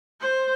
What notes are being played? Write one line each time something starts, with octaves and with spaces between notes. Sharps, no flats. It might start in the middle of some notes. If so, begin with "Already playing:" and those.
C5